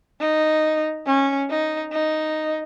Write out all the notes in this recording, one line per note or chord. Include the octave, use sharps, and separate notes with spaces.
D#4
C#4
D#4
D#4